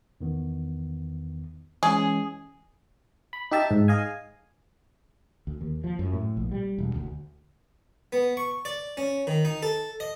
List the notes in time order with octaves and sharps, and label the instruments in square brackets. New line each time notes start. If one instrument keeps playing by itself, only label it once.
[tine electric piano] E2 D#3 B3
[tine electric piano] E3 G#3 C#4 [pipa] G#4
[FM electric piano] B5
D#4 G4 E5 A5
G#2
G#4 D#5 F5 G#5
[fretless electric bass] D2
D#2
F3
F#2
A2
A#1
G3
E1
D2
[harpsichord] B3
C#6
D5
C#4
D#3
D#4
A4
D#5